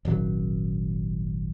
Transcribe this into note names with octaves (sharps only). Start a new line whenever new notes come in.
D#1 G#1 F#3